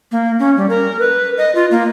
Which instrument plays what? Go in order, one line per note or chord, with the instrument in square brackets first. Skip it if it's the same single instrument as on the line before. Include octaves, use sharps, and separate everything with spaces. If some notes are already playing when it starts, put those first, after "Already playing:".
[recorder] A#3
C#4
G3
A#4
B4
D#5
F4
A#3